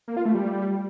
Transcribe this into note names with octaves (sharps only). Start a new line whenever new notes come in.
A#3
F4
A3
G3